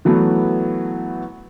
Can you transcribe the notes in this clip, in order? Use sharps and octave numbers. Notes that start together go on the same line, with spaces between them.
E3 F#3 A3 B3